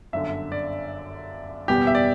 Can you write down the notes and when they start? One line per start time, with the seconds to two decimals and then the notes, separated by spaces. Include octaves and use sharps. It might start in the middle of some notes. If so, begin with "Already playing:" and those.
0.13 G1 F#2 D3 E5
0.52 D5
1.68 F#1 E2 B2 G3 B3 G4
1.87 E5
1.95 D5